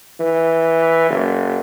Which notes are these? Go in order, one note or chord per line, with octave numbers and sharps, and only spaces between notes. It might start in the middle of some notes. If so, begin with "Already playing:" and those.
E3
F#1